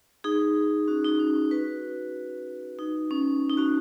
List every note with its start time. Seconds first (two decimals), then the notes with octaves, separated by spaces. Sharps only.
0.24 D#4 G#4
0.88 C#4 F#4
1.04 D#4
1.19 C#4
1.35 C#4
1.51 F#4 B4
2.79 D#4
3.11 C#4
3.50 D#4
3.57 C#4 F#4